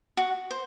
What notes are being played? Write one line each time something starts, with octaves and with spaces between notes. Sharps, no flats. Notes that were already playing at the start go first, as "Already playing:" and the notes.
F#4
C5